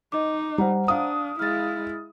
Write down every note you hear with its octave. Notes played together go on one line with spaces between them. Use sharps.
D#4 D#5 D6
G3 C5 F#5 A#5
D4 F5 D#6
G#3 E4 F6 A6